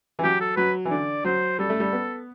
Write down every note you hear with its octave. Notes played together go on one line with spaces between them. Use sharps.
E3
F#3 G4
A4
F#3 B4
E3
D3 D5
F#3 C5
G3 A4
A3
G3
B3